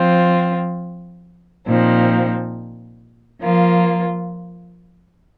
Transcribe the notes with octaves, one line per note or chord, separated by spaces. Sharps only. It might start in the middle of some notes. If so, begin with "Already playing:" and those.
Already playing: F3 C4 F4
A#2 F3 C4 D#4
F3 A#3 F4